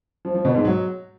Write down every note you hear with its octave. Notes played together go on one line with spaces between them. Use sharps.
F3
F3
B2
G#2
F#3